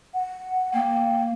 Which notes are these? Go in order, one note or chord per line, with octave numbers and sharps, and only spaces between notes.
F#5
A#3 G5